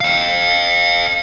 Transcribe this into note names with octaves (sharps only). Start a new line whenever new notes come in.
F5 G5